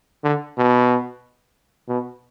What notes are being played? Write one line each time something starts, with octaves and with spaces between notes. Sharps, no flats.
D3
B2
B2